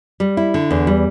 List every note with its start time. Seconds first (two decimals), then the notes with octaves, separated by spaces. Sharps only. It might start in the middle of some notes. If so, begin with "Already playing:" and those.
0.20 G3
0.37 E4
0.54 D3
0.71 E2
0.87 G3